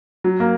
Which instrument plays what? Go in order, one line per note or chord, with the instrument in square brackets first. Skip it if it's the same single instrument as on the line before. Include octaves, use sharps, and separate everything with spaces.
[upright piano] F#3
A#3